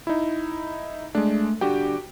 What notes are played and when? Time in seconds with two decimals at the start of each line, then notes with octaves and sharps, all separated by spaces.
0.07 D#4 E4
1.15 G#3 A3 D4
1.61 G2 D3 G3 F#4 G4 G5